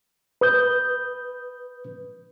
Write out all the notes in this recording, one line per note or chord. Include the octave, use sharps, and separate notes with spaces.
B4 D#6 G6